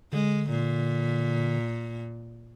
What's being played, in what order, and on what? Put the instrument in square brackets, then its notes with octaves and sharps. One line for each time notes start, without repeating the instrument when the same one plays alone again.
[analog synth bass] D3 [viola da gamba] G#3
[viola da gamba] A#2